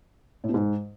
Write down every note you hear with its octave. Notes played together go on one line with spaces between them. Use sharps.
A2
B2
G#2